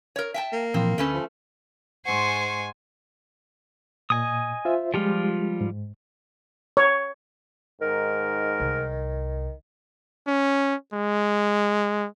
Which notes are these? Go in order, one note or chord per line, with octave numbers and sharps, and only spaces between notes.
A#4 C#5
E5 G5 A5
A#3
A#2 E3 F3 C4
D2 A3 C#4 A4 B4
F3
G#2 G#3 C5 F#5 G#5 C6 C#6
A#2 D#5 G#5 D#6
F4 C5 E5
F3 G3 G#3 F4 G4
G#2
C#5
G#2 D#3 A#4
C2
C#4
G#3